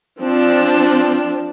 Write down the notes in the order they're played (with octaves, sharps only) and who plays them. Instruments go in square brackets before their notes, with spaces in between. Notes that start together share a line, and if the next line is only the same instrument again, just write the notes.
[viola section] F3 C4 D4